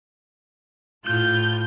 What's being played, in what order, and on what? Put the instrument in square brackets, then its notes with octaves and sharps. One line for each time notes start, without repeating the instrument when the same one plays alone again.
[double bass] A2 [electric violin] F4 G6